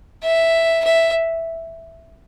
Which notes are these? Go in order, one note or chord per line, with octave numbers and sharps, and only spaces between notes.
E5
E5